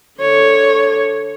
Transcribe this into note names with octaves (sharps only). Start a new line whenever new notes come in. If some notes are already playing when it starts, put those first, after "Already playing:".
D3 C#5